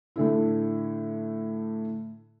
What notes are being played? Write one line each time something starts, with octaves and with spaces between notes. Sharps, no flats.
A2 D3 E4